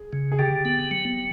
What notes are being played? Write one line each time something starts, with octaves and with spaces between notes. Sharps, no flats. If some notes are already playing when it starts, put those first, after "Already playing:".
Already playing: G#4
C#3
G#4
D3 G4
B3
F#3